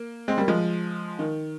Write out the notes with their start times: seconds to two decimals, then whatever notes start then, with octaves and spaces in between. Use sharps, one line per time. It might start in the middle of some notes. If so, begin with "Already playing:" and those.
Already playing: A#3
0.28 G#3 C4
0.38 G3 A#3
0.48 F3 G#3
1.19 D#3